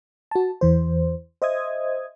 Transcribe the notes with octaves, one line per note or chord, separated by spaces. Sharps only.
F#4 A5
E2 E3 C5
C5 D#5 E5 D#6 G#6